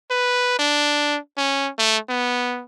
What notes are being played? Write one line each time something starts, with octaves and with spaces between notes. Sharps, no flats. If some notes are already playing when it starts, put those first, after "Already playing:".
B4
D4
C#4
A3
B3